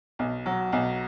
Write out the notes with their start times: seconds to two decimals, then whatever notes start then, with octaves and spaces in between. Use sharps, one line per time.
0.19 B1
0.46 F#3
0.73 B1